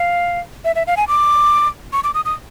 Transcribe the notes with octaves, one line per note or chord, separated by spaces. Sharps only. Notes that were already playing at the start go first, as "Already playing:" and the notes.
Already playing: F5
E5
E5
F5
G#5
D6
C#6
D6
D#6
D#6